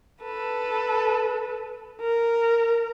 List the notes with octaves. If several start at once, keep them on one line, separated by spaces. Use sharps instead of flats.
A4 B4
A#4